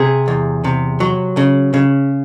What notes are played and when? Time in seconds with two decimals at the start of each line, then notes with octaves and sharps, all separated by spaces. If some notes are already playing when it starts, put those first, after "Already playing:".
Already playing: C3 G#4
0.28 E2
0.64 C3
1.00 F#3
1.37 C#3
1.74 C#3